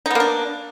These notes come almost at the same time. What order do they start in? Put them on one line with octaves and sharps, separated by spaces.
D#4 B3 A#3 D4